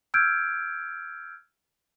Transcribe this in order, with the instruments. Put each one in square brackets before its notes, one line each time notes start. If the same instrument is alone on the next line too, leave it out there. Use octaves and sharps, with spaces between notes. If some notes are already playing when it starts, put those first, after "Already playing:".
[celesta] E6 F6 G6 G#6 D7